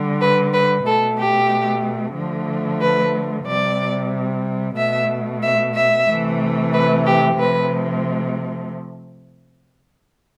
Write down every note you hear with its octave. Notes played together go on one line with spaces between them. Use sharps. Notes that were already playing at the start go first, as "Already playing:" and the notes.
Already playing: D3 G3
B4
B4
B2 A3 A4
G4
D3 F3 A3
B4
C3 G3 D5
B2 A3 E5
E5
E5
C3 E3 A3
B4
G4
C3 F3 A3 B4